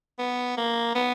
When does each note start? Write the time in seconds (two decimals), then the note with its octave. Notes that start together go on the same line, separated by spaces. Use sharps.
0.19 B3
0.57 A#3
0.95 B3